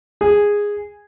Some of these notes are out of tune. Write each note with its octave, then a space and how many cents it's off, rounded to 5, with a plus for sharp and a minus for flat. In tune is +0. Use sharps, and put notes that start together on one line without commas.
G#4 -10